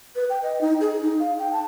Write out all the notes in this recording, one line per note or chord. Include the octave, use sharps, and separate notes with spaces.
B4
G5
D#5
D#4
G#4
D#4
F5
G5
A5